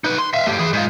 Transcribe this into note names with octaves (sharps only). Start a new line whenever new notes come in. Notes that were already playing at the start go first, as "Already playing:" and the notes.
D#4 B4
C6
E5 F5
A3 G4
E3 G#4
G#2 F4